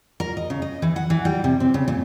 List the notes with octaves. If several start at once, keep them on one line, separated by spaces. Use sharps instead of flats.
A#4
D#5
C#3
D#5
E3
F#5
E3
G3
C3
C4
C#3
A#2